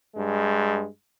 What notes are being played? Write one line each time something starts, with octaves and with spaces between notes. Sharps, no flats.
G2 G#3